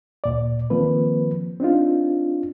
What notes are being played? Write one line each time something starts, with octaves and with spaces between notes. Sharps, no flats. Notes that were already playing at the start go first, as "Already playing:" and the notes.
D2 A#2 D5
D#3 F3 A#3 C4 B4
C4 D4 D#4 F4